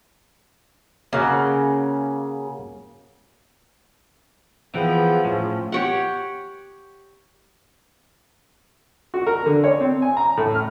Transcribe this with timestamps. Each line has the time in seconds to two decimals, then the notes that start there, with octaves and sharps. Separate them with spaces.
1.13 C#3 A#3 C#4 F#4
4.75 E3 F3 B3 G#4 G5
5.25 A2 C#4
5.72 G4 C#5 F#5
9.14 F#4
9.27 A#4
9.46 D3
9.64 C#5
9.80 C4
10.02 G#5
10.17 A#5
10.37 A2
10.55 F6